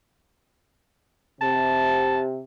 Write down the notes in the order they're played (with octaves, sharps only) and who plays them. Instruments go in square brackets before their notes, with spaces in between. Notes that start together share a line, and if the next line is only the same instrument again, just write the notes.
[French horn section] C3 [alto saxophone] A5